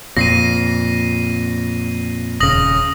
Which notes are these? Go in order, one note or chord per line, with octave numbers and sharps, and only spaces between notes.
F2 A#2 A#6 C7 D#7
D#1 C#3 D#6 A#6 F#7